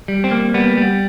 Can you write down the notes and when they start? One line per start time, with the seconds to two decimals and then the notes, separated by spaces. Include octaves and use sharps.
0.08 G3
0.24 C4
0.31 A#3
0.54 G3 B3
0.77 G3